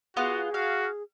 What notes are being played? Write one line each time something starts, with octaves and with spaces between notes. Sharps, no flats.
B3 F4 F#4 G#4 F#5
F#4 F5